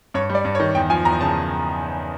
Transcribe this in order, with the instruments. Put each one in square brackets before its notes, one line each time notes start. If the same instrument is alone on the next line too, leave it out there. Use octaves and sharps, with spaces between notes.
[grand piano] G2 C#5
G3
D5
G2
C#5
D#3
E2 G5
F3 G#5
E2 A#5
C#3 A5